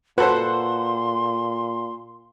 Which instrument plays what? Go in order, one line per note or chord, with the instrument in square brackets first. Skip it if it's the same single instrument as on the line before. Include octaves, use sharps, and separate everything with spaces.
[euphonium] A#2 [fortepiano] F#4 A4 C5 [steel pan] B4 [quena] C6